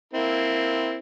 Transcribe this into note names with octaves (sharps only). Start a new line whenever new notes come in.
A#3 C4 E4